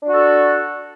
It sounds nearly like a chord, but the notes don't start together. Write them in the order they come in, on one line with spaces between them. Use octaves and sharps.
D4 F#4 A4